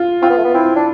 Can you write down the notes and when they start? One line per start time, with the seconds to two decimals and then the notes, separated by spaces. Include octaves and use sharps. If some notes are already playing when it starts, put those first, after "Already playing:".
Already playing: F4
0.22 C4 F4
0.30 B3
0.37 A3
0.45 B3
0.54 C4 E4
0.76 D4